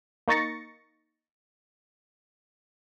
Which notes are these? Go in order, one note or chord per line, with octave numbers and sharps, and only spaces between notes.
A#3 D#4 C#6 A6 A#6 C#7